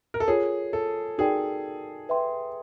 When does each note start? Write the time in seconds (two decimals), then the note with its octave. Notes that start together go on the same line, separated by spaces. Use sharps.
0.14 A#4
0.20 A4
0.28 F4 G#4 A#4 C#5
0.73 A4
1.18 D#4 F#4 G#4 A#4 D5 G5
2.09 B4 E5 G5 C6